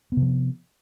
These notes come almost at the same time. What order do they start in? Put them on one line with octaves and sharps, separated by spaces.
B3 C3 F3